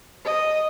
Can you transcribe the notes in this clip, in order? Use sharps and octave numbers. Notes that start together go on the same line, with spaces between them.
D#5